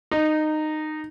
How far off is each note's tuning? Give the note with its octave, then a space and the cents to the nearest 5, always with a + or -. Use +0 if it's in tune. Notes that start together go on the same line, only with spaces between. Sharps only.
D#4 -15